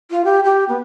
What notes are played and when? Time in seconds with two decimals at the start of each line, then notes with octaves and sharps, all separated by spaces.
0.11 F4
0.25 G4
0.44 G4
0.69 B3